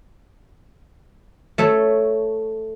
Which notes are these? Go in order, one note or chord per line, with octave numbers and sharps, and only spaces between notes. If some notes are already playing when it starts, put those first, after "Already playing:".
A3 A4 C#5 E5